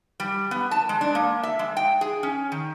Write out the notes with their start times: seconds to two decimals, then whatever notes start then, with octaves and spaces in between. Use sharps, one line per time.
0.20 G3
0.51 B3
0.71 A5
0.89 G#3
1.01 D4
1.15 A#3
1.43 E5
1.59 G#3
1.77 G5
2.01 G#4
2.23 C#4
2.52 D#3